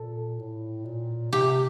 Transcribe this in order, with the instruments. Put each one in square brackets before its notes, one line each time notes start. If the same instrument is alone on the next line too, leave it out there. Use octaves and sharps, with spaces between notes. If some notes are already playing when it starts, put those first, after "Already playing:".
Already playing: [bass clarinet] A#2 [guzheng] A4
[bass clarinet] A2
A#2
[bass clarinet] C3 [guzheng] G4